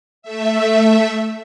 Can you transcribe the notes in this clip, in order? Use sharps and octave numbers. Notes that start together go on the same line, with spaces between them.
A3 E5